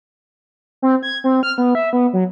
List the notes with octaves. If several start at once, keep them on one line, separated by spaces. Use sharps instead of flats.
C4
G#6
C4
F6
B3
E5
B3
F#3